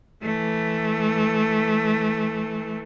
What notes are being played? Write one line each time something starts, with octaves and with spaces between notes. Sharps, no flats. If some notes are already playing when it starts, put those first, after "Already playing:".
E3 A3